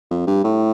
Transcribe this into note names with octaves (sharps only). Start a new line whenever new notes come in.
F2
G2
A2